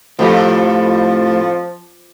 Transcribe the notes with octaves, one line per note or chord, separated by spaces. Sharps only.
F2 A2 F3 G4 A4